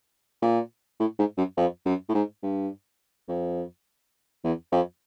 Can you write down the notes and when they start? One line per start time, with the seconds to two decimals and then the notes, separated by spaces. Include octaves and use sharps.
0.42 A#2
1.00 A2
1.19 G#2
1.38 F#2
1.57 F2
1.86 F#2
2.09 A2
2.14 G#2
2.43 G2
3.29 F2
4.44 E2
4.72 F2